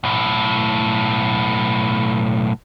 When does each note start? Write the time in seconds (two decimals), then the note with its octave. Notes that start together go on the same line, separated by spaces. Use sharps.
0.04 B1 A2